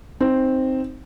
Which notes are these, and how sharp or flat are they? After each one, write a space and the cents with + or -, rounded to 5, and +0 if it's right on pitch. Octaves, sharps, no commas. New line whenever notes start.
C4 +0 D#4 +0